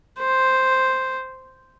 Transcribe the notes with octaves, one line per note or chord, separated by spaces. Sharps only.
C5